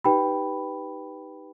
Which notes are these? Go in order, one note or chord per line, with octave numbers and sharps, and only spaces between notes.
D#4 G4 B4 G5 B5